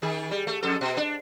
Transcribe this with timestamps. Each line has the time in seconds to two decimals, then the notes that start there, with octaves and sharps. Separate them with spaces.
0.02 D#3 G#4
0.31 G3
0.47 A3
0.63 F2 A4
0.81 B2
0.97 D4